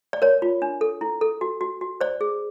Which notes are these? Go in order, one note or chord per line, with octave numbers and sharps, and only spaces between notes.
D5
A#4 C#5
F4
D4
A4
E4
A4
F#4
F#4
F#4
C5 D5
G#4